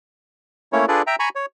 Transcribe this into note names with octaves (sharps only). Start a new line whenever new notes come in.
A3 A#3 C#4 E4 C#5
D4 F4 G#4 A4 B4 D5
E5 G5 A#5
G#5 A#5 B5 C#6
C#5